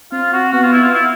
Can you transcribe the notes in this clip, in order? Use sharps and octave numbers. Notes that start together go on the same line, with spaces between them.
C4 F4
F#4
B3 F#4
F4
E4
F4
E4